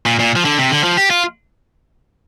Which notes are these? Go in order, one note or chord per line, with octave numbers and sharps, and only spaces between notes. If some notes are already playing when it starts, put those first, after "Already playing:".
A#2
A#2
F3
D3
C3
D3
F3
G4
F4